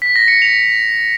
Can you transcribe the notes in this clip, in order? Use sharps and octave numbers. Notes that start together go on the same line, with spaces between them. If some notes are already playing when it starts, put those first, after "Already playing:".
B6
A#6
C#7
F7